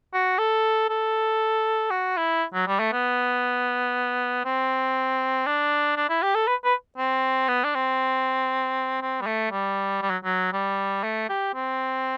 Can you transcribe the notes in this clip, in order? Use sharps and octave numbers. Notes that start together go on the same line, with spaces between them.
F#4
A4
A4
F#4
E4
F#3
G3
A3
B3
C4
D4
D4
E4
G4
A4
B4
B4
C4
B3
D4
C4
C4
G3
A3
G3
G3
F#3
F#3
G3
A3
G4
C4